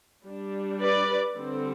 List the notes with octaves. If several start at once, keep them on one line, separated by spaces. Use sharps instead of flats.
G3 D4
B4 D5
D3 G3 C4